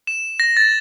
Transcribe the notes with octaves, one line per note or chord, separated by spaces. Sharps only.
E7
A#6
A6